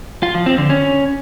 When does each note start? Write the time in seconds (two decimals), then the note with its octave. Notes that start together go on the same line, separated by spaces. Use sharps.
0.23 F4
0.35 F3
0.46 C4
0.58 D3
0.70 C#4